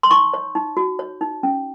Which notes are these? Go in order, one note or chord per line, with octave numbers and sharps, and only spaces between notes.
C6
D#4 C#6
C#5
D#4
F#4
C#5
D#4
C#4